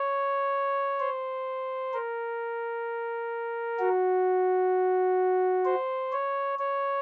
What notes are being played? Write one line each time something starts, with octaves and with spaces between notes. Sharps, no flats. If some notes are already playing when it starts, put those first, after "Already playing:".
Already playing: C#5
C5
A#4
F#4
C5
C#5
C#5